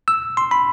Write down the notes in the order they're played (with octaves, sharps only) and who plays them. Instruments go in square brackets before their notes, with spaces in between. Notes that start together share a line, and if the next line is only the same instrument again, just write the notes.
[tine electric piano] E6
C6
B5